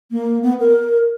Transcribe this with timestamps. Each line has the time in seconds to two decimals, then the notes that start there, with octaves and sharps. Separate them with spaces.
0.11 A#3
0.42 B3
0.60 A#4